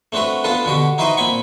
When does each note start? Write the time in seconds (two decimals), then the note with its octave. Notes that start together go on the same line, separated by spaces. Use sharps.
0.12 A3 C4 D4 F#4 B4
0.44 B3 D4 F4 A4 B4
0.65 B2 D3 F#4 G4
0.98 D#4 E4 F#4 B4 C5 D#5
1.17 A#2 C4 G#5 B5 C#6